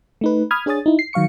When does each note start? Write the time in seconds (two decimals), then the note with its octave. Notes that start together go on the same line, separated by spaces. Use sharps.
0.21 A3 D#4 B4
0.51 B5 D#6 F6 G#6
0.66 D4 G#4 C#5 G#5 D#6 A6
0.86 D#4 E4
0.99 C7
1.13 D#3 F#3 F5 C#6 C#7